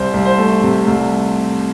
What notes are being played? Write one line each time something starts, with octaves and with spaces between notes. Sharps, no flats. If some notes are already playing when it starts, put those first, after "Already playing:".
Already playing: C2 C5
C2
C5
A3
C3
C2